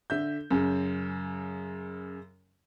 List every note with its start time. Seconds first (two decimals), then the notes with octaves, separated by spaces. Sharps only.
0.10 D3 E5 G6
0.51 F#2 C#3